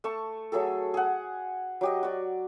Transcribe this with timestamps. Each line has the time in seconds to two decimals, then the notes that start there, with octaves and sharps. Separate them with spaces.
0.04 A3 A5 C#6
0.52 F#3 A3 G#4 A4
0.94 G#4 F#5
1.81 F#3 G4 D#5
2.03 F#4 D5